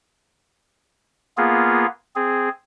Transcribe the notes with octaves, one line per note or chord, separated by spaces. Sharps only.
A#3 B3 F4 G#4
C4 G#4